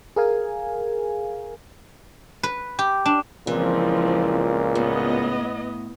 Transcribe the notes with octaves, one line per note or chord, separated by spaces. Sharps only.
G#4 A#4 F5 G#5
B4
G4
D4
C#2 A#2 E3 F3 C4
A2 B3 D#5